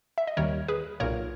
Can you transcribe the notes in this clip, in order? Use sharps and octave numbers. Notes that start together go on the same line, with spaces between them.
E5
D#5
D#2 D#3 G3 A#4 C#5
G#4 B4
B1 A#2 A#3 A#4 C#5